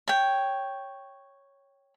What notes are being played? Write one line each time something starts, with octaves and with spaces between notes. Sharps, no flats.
C#5 G5